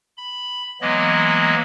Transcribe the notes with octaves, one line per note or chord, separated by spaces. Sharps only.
B5
E3 F#3 G#3 A#3 B3 D#5